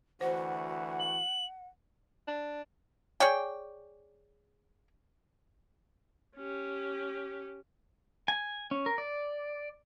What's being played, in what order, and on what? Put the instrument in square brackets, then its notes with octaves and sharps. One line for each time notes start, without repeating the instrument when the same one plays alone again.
[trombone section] D2 E3 F#4 [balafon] C5 [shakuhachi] F#5
[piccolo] F#7
[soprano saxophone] D4
[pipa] G#4 C#5 D5 G5
[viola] C#4 G4
[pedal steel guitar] G#5
C#4
A#4
D5